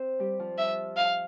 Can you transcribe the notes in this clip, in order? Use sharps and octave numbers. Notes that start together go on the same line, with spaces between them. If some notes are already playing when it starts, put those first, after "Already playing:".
Already playing: C4 C5
G3 G4
F3 F4
E5
F5